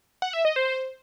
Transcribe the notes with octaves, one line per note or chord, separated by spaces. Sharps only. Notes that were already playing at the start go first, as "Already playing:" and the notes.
F#5
E5
D#5
C5